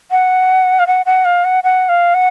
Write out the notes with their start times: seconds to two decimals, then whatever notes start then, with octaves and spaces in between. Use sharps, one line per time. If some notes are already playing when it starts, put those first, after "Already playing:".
0.11 F#5
0.79 F5
0.87 F#5
1.06 F#5
1.25 F5
1.44 F#5
1.64 F#5
1.89 F5
2.14 F#5